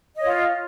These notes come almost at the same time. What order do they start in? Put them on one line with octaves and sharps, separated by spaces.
D#5 C#5 F4